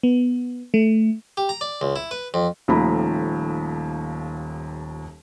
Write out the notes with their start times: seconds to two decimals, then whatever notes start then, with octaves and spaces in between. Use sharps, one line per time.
0.03 B3
0.74 A3
1.37 G4
1.49 A#5
1.61 D5
1.81 C#2
1.96 E4
2.11 B4
2.34 F2
2.68 D#1 D#2 F3 A3 A#5 B5